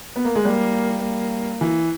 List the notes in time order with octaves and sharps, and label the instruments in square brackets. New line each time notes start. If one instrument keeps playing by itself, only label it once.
[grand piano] B3
A#3
G#3
[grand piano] G3 [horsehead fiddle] A#3
[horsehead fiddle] A#3
[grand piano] E3